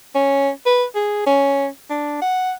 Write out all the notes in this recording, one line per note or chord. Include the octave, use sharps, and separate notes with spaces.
C#4
B4
G#4
C#4
D4
F#5